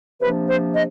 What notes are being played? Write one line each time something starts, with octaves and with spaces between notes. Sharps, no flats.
C3 F3 A#3 D4 B4
C5
D#5